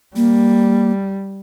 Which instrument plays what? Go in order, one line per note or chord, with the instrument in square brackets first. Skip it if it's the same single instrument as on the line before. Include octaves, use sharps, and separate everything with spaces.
[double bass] G3 [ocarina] A#3